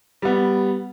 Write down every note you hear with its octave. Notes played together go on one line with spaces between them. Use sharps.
G3 B3